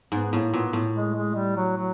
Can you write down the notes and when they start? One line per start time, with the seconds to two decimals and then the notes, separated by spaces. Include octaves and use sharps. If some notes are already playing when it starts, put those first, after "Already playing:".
0.12 G#2 B3
0.33 A2 A#3
0.53 A#2 B3
0.73 A2
0.94 G#3
1.15 G#3
1.35 G3
1.56 F#3
1.77 F#3